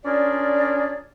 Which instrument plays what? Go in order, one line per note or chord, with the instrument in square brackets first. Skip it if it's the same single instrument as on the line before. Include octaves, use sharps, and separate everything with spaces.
[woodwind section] C#4 D4 F4 G#4 A#4 D5